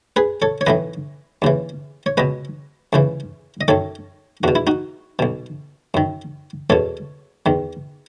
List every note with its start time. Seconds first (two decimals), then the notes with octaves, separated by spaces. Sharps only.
0.16 G#4 B4
0.42 A4 C#5
0.61 C#5
0.67 B1 A2 E3 B4 D#5
1.42 D#2 C#3 E3
2.06 C#5
2.17 C#2 B2 B4 D#5
2.93 C#2 C#3 E3
3.61 D#5
3.68 F#2 D#3 A4 C#5
4.43 E2 B2 F#4
4.55 E4
4.67 D#4 F#4
5.19 B1 B2
5.94 F#2 D#3
6.70 E2 B2 A4 C#5
7.46 E2 D#3